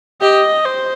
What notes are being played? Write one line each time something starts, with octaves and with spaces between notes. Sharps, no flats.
G4 D#5
C5